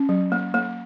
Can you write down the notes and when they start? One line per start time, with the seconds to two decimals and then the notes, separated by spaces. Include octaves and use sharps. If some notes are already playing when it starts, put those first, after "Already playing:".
Already playing: C#4
0.09 F#3
0.32 A#3
0.54 A#3